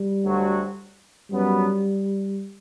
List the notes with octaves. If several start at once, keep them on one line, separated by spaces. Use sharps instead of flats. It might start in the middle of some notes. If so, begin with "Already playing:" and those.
Already playing: G3
D2 D3 F#3 C4 F#4
F#2 F#3 G3 B3